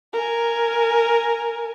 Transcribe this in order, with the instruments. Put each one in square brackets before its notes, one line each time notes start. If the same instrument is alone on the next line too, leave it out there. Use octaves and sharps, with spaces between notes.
[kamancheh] A#4 G#5